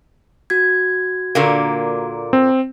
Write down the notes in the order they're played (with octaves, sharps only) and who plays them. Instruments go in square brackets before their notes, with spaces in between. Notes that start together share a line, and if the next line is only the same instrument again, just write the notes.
[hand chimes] F#4 G#6
[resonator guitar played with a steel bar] A#2 D3 A#3
[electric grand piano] C4